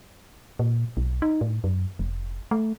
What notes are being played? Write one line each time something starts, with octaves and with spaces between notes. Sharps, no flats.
A#2
B1
D#4
A2
F#2
F1
A3